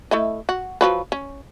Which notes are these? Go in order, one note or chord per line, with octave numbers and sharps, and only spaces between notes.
A3 E4 D#5
F#4
F3 F#3 B4
C#4